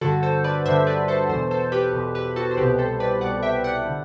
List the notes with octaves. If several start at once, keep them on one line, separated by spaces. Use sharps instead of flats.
G2 D3 F#4 A4
A4 C5
B4 D5
G2 D3 C5 E5
B4 D5
A4 C5
E2 B2 A4 C5
A4 C5
G4 B4
E2 B2
G4 B4
B4
F#4 A4
C5
C2 B2 G4 B4
A4 C5
B4 D5
C2 B2 D5 F#5
E5 G5
D5 F#5
D3